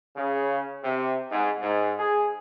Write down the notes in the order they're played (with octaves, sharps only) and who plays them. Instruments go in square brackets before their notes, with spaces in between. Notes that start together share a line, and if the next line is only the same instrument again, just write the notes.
[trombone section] C#3
C3
G#2
G#2
G#4